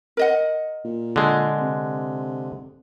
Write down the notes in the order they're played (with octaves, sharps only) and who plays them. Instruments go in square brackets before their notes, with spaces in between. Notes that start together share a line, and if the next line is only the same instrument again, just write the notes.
[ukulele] A#4 D#5 F#5
[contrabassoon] A#2
[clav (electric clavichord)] D3 G#3
[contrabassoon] C3